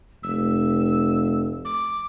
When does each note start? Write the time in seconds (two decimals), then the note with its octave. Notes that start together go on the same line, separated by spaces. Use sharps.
0.23 F1 E6
1.65 D6